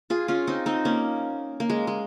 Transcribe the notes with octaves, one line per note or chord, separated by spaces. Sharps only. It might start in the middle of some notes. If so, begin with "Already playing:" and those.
F4 G#4
C#4 F4
C4 D#4
C4 D#4
A#3 C#4
A#3
G#3
G#3